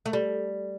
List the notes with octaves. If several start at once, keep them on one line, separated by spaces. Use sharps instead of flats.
A3
G3